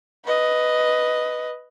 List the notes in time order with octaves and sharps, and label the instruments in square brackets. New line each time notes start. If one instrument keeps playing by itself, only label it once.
[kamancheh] B4 D#5